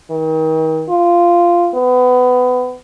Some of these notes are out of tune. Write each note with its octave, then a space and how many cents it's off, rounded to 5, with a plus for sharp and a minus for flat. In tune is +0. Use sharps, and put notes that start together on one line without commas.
D#3 +35
F4 -10
B3 +25